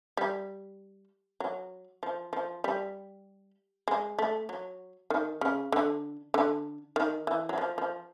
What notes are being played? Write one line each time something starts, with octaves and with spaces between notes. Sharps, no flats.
G3
F#3
F3
F3
G3
G#3
A3
F#3
D#3
C#3
D3
D3
D#3
E3
F#3
F3
F3